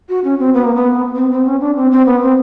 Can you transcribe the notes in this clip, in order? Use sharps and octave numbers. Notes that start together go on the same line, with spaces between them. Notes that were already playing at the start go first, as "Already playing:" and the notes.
F#4
C#4
C4
B3
A#3
B3
C4
C4
C#4
D4
C4
C4
B3
C4